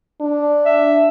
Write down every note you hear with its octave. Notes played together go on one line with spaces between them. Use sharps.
D4
E5